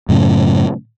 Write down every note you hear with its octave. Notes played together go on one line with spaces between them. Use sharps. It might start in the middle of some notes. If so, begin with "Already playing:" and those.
F#2 A2 C#3